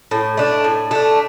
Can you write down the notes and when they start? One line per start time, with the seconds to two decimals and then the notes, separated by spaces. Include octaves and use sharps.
0.11 A2
0.37 A3 D4
0.64 A2
0.91 A3 D4